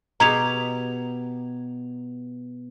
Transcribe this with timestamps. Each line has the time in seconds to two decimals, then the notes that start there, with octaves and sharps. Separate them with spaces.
0.20 B2 B3 G4 A#5 G#6 F7